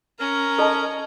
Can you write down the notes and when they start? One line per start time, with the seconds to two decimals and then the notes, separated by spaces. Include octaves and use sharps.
0.19 C#4 A#4 A#5
0.58 A4 D#5 A5